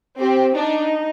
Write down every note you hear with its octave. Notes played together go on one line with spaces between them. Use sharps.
C4 G4
D4 D#4